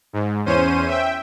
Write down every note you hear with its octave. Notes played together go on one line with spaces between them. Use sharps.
G#2
E2 C#4 C5 D#7
E5 G5